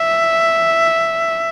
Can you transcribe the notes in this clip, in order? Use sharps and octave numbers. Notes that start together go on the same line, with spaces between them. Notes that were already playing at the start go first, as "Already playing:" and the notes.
Already playing: E5